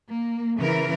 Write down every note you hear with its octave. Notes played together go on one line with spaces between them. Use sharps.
A#3
C#3 E3 A#4